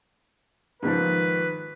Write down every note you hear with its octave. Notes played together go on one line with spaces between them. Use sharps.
G#2 D#3 F3 B4